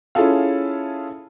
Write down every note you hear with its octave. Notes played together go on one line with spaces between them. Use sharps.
C#4 E4 F4 G#4 A4 F5